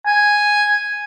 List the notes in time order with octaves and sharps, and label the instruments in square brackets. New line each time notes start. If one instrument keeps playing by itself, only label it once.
[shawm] G#5